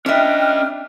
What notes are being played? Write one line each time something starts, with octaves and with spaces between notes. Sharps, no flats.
C#4 D4 D#5 E5 G5 F6 F#6